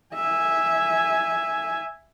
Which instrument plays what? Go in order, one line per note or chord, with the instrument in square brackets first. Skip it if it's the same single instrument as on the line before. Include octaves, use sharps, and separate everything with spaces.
[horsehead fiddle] E5 G#5